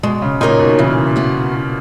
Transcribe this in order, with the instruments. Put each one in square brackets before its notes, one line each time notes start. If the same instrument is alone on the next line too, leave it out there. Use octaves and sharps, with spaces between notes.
[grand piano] B2 [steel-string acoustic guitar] G#3
[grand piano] C#3
[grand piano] A#2 [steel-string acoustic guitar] D#4 A#4 C#5
[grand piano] B2
[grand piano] C#3 [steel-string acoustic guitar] E3
[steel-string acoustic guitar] B3 F#4